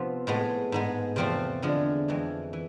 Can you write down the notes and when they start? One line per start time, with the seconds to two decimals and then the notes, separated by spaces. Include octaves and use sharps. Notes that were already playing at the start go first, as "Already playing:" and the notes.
Already playing: C3 F3 B3 F4
0.27 A2 G#3 B3
0.72 G#2 G#3 B3
1.16 E2 C3 F3 A3 C4
1.62 E2 D3 F3 G#3
2.08 F2 E3 G#3
2.53 E3